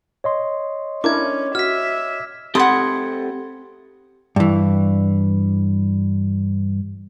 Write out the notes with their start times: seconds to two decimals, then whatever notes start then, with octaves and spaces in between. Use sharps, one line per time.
0.24 C#5 D#5 C6
1.04 C#4 D4 E4 A#4 D6 G#6
1.55 F#4 E5 F6 B6
2.55 C4 G4 A4 F#5 B5 C6 D#6 G#6
4.36 G2 E3